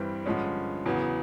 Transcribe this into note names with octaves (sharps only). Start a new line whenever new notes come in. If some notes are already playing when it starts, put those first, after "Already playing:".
Already playing: G2 E3 G3 C4
G2 D3 F3 G#3 C#4
E2 C#3 F#3 B3